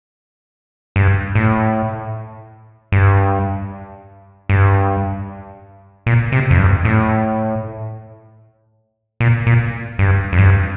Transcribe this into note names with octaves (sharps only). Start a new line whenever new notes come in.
G2
A2
G2
G2
A#2
C3
F2
G2
A2
A#2
A#2
G2
F2
G2